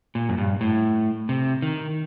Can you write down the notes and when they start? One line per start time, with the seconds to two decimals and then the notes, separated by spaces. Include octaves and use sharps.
0.15 A#2
0.29 F#2
0.38 G2
0.61 A2
1.29 C3
1.62 D#3